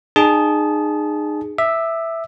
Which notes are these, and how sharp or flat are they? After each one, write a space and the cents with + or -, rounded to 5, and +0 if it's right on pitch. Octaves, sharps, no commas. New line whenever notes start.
D#4 -35 G#4 -5 A5 -25
E5 +0 D6 +45